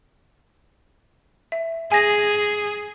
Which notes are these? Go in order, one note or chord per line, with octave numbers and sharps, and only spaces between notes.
E5
G#4 G#5 A#6